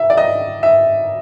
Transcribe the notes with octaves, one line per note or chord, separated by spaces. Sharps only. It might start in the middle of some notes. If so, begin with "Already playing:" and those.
Already playing: E5
D5
D#5
E5